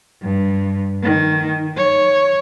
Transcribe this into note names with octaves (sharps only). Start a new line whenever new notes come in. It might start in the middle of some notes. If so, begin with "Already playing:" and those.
G2
D#3
C#5